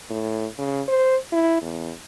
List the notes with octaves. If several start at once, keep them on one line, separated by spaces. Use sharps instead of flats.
A2
C#3
C5
E4
E2